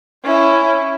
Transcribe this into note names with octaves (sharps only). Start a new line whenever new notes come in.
C#4 E4